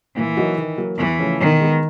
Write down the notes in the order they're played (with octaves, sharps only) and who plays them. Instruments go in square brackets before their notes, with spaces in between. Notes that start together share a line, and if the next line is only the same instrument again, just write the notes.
[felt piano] A#2 [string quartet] E3
[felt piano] F#3 A#3 D#4 F#4
D#3
F#3 A#3
[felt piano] E2 [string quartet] E3
[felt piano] C#3 F3 A3 C#4
[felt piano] B2 [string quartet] D#3
[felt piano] G#3 B3